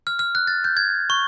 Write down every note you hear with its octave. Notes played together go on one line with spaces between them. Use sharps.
F6
F6
F#6
A6
G6
G#6
C#6